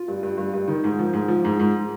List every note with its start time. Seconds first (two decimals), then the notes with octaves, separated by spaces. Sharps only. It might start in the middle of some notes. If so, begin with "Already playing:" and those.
Already playing: F4
0.08 G2
0.23 G2
0.38 G2
0.54 G2
0.68 D#3
0.84 G#2
0.99 F3
1.13 G#2
1.28 F3
1.45 G#2
1.60 G#2